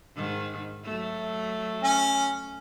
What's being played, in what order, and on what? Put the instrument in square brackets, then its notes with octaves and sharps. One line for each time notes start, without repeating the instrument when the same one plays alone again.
[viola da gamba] G#2 D#3
F#3 A3
[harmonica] C#4